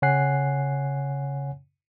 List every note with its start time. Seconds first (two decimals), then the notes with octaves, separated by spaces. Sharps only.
0.02 C#3 C#5 F#5 G#5 F#6 C7